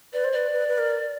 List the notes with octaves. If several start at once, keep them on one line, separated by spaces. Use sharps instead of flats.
B4 D5
C5
B4 D5
B4
B4
A#4